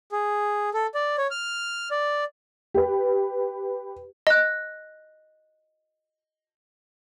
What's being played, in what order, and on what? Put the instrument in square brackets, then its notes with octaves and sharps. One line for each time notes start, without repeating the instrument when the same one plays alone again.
[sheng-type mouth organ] G#4
A4
D5
C#5
F6
D5
[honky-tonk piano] G4 B4
[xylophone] D#5 F#6